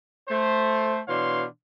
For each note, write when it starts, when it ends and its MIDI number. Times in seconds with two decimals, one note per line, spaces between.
0.29 0.99 57
0.29 0.99 72
1.08 1.45 47
1.08 1.45 52
1.08 1.45 62
1.08 1.45 73
1.08 1.45 77
1.08 1.45 84